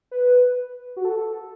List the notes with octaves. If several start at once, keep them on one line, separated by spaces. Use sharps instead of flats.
B4
F#4
A4